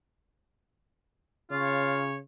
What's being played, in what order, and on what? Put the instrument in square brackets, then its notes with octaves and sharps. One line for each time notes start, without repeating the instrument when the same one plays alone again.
[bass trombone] C#3 [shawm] F4 [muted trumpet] C#5